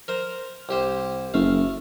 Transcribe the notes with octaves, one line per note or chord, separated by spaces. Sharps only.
A#4 C5 A#5
C2 G4 C5
F#1 A3 F5